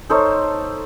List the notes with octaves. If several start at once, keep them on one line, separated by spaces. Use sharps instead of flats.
D#4 A4 C5 C#5